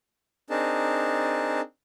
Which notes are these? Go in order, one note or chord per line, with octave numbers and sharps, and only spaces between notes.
C4 D4 D#4 G#4 A#4 A5